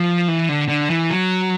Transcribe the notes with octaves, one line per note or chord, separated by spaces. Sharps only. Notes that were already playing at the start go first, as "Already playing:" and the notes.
Already playing: F3
E3
D3
D3
E3
F#3